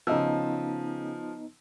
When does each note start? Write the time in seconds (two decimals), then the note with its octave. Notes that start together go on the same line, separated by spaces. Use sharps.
0.07 C#3 F3 B3 D#4 D#5 E6